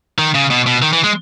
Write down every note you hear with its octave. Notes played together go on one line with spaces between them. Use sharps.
D#3
C#3
B2
B2
D#3
E3
G#3